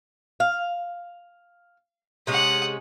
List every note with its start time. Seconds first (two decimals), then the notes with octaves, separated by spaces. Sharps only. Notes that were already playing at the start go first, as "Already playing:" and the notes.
0.40 F5
2.27 C3 G#3 C#4 F#5 D#6